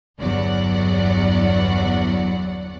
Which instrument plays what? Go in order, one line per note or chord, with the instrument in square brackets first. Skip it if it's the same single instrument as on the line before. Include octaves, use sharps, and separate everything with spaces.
[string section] G1 E2 F#3 D5 F#5